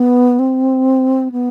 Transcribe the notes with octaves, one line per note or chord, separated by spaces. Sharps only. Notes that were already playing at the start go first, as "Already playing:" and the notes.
Already playing: B3
C4
B3